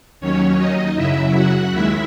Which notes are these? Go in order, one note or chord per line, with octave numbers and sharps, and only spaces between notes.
D#2 D#3 F#3 C#4 C#5
D#4 D#5
F#2 C#3 F#3 E4 E5
F#4 F#5
D#2 D#3 G#3 E4 E5